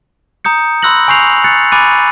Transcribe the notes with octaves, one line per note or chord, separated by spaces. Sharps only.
A#5 D#6 G6 C#7
B5 C6 E6 F#6 A#6 F#7
G#5 C#6 G6 C7 F7
F#6 A6 C#7
G#5 B5 D6 F#6 A6 D#7